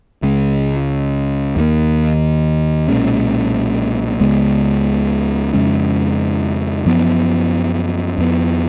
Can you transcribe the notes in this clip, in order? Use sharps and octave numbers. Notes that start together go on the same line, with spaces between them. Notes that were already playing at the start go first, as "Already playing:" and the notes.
C#2 C#3 G#3
D#2 D#3 A#3
B1 A#2 G#3 C#4
C#2 C#3 G#3 B3
F2 C#3 G#3 C#4
F#2 F3 B3
F2 F3 B3